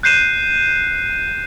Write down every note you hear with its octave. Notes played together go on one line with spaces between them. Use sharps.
F#6 G6 C7 D#7 E7